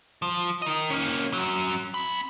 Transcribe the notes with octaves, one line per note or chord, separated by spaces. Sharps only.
F3
A#4 D#5
A#3 C#4
F#2 F#3
C4 B5